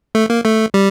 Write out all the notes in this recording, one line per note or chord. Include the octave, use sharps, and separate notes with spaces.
A3
A#3
A3
G3